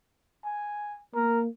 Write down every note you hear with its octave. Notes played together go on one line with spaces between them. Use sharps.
G#5
A#3 A#4